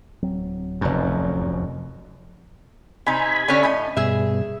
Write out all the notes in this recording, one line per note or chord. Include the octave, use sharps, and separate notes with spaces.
D1 F#3 C4
F1 F#2
C3 D#4 G#5 B5
D3 C#4
A2 D#5
G2 B2 G#4 E5